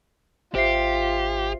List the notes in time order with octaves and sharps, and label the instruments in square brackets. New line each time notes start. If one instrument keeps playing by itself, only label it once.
[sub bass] G#1 [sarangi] F4 [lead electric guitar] G4 [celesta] C5 E5 C7